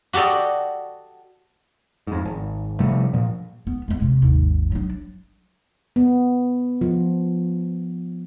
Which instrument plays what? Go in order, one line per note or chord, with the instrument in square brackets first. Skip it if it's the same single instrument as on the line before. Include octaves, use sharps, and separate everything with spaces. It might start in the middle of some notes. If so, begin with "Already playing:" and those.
[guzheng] F#4 G4 A4 D5 D#5
[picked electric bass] F2 G#2
G#1
C3 F3 G3 A3
A#2 F3
[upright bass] B3
G#3 B3
C3
G#1 D#2
F#3 D4
[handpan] B3
F3